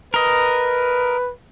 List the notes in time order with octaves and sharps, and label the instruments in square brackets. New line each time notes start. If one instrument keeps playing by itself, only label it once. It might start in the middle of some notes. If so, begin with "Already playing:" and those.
[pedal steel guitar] A#4 D#5 [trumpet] B4